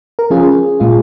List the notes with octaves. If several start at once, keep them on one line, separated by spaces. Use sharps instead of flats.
A#4
F3 C#4 F4 G#4
A#2 G#3 F4